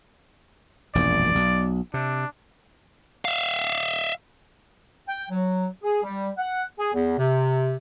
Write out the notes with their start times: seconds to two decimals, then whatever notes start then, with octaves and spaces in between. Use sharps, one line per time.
0.95 E1 A#1 F#2 D5
1.35 B1
1.94 C3 D4
3.25 E5 F5
5.08 G5
5.30 F#3
5.83 G#4
6.03 G3
6.38 F#5
6.78 G#4
6.94 E2
7.18 C3